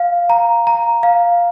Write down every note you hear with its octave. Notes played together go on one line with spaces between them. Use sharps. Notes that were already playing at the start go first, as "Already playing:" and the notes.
Already playing: F5
A#5
A#5
F5